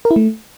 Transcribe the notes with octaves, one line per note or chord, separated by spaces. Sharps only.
A#4
E4
A3